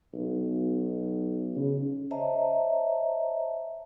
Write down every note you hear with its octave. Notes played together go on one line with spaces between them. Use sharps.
B1
C#3
C5 C#5 D#5 E5 A5 A#5